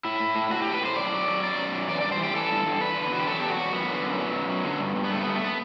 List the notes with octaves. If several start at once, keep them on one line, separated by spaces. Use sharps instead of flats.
A2 E4
A2
A2
A2 F#4
A2 G4
B4
A2 C5
F#2 D5
F#3
F#3
F#2 D5
F#2
F#3
E3 D5
G2 D5
C5
E3 G4
E3 A4
G2
G2
E2 B4
D3
E2 F#4
G4
F#3 A4
E2 G4
F#4
E2
F#2 B3
D3
F#2
F#3
F#2
F#3
D3
G2
G2
B3
G2 A3
G2 B3
A3
B3